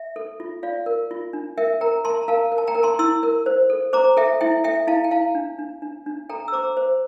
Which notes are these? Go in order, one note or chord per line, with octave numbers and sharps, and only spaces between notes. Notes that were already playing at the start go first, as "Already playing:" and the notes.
Already playing: E5
A4
F4
F4 D5 F5
A#4
F4
D4
A#4 E5 G5
A#4 G5 A#5
A#4 A5 C6
A#5
A#4 F5 A5
A#4
A5
G5 A#5
A#4
A5 C6
E4 C6 E6
A#4
C5
A4
C5 A#5 D6
A4 E5 G5
E4 E5 G5
A4 E5 G5
E4 F5 A5
G5
E4 F5 A5
D4
D4
D4
D4
A4 G5 A#5
E6
C5 A#5 D6
C5